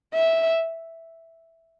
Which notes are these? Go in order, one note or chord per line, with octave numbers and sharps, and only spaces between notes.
E5